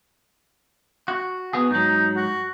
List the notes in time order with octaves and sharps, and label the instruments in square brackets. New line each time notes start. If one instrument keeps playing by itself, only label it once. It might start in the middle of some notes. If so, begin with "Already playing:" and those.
[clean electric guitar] F#4
B3 F#4 G#4
[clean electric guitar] G#2 F#3 [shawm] D#4
[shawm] F#4